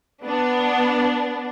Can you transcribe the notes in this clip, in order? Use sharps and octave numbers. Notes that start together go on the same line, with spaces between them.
B3 D4